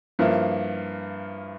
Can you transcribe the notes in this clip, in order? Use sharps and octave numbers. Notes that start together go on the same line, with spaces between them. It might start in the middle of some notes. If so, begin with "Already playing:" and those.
G2 F3 A#3 E4